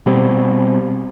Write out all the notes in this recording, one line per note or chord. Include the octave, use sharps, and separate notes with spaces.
B2 G3 C4